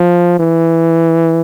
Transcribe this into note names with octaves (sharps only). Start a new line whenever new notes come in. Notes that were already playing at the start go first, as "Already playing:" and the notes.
Already playing: F3
E3